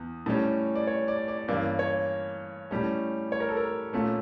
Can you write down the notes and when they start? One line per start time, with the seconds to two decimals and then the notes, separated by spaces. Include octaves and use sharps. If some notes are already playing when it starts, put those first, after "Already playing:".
Already playing: E2
0.26 A2 G3 C#4
0.76 D5
0.87 C#5
1.08 D5
1.28 D5
1.48 G2 E3 A#3 C#4 D5
1.79 C#5
2.71 A2 G3 C#4
3.32 C#5
3.40 A#4
3.49 A4
3.57 A#4
3.93 A#2 A3 C#4